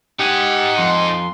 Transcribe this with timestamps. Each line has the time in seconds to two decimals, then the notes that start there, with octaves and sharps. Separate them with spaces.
0.20 D#4 G4 F#5 G#5
0.79 F2 C6